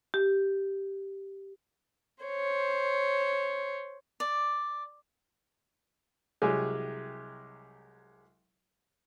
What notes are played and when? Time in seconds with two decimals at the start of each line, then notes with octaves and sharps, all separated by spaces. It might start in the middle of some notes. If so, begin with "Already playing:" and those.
0.14 G4
2.24 C5 C#5
4.20 D5
6.42 C2 F#3 G#3 G4 G#5